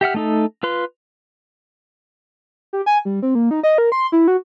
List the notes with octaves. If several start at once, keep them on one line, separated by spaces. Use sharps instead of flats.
G4 E5 F#5 F6
A3 D#4 A4
F4 B4 C6
G4
G#5
G3
C4
A#3
D#4
D#5
A#4
C6
E4
F#4